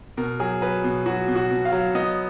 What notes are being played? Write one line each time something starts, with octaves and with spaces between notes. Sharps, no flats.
B2 A#4
F#3 G#4
F#3 B4
B2
F#3 F#4
B2
F#4
B2
F5
F#3
B3 D#5